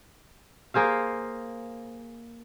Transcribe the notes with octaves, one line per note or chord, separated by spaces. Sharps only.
A#3 G#4 C5 F5